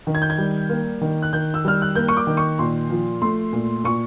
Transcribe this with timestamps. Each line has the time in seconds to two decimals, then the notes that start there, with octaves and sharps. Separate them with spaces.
0.07 D#3
0.15 G#6
0.22 G6
0.30 G#6
0.38 G3
0.69 A#3
1.01 D#3
1.22 F#6
1.33 D#3 G6
1.54 E6
1.65 G3 F6
1.82 F#6
1.95 A#3 G6
2.08 C#6
2.17 D6
2.27 D#3
2.37 C#6
2.59 A#2 C6
2.90 F3
3.22 A3 C6
3.53 A#2
3.84 A#2 C#6